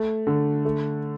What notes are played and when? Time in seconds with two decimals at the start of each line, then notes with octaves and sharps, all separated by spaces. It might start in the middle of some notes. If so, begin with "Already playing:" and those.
Already playing: A3
0.27 D3
0.65 A3